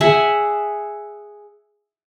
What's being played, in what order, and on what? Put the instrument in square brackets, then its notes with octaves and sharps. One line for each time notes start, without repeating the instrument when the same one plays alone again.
[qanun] G#4 E5 F#5 G#5